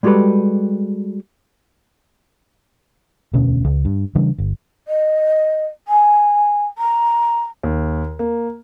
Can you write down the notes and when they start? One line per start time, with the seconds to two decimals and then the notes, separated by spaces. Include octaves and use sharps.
0.03 G3 G#3 F#4 G4 A4 B4
3.34 E1 D2 B2 C#4
3.64 C#2
3.85 G2
4.15 C#3 E3 G3 D4
4.38 G1
4.87 D#5
5.87 G#5
6.77 A#5
7.63 D#2
8.19 A#3